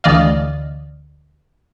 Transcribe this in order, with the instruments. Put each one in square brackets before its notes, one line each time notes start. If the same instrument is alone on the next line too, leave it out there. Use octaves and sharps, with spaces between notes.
[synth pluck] D2 D3 E3 D5 D#5 F5